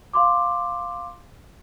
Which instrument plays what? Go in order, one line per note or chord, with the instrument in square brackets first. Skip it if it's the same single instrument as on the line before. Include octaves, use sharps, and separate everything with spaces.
[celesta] F5 C6 D6